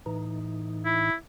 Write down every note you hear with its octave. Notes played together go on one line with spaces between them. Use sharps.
A2 E3 D#4
E4